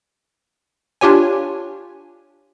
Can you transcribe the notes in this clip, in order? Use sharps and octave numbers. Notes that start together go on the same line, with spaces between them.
D4 F4 G4 C#5 G#5